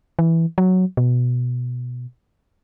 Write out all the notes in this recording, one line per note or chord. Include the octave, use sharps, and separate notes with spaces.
E3
F#3
B2